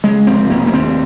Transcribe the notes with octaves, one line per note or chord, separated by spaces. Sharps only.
C#3 G#3
F1 C4
F1 A#3
A#3
D#2 C4